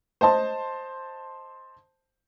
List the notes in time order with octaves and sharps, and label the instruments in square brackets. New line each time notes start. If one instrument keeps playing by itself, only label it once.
[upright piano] C5 D#5 A5 C6